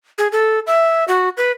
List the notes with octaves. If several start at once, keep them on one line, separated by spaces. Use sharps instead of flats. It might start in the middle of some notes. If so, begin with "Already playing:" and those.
G#4
A4
E5
F#4
B4